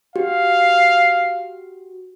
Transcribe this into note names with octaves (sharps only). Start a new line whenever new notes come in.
F#4 G4 F5